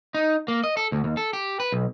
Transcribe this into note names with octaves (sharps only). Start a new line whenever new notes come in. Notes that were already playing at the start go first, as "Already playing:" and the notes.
D#4
A#3
D#5
A4
D2
D#2
A4
G4
B4
B1